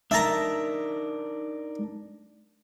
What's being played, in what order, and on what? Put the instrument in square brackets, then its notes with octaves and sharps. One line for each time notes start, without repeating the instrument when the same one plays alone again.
[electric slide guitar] D4 D#4 A#4 [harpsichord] E5 A5 A#5